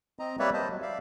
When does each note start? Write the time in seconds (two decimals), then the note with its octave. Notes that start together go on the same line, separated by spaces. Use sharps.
0.19 C4 D#5 A#5
0.39 G3 A#3 B4 C#5 D5 E5
0.53 C5 D#5 A5
0.70 F#3
0.82 D5 E5 F5